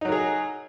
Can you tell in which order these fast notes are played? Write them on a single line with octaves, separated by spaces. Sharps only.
D#4 F#3 A#4 G#4